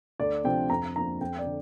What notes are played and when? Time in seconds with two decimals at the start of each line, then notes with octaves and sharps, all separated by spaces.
0.19 D2 D5
0.44 C3 F3 D4 G5
0.70 F2 A#5
0.96 F3 A#3 D4 A#5
1.20 F2 G5
1.38 D5
1.46 D3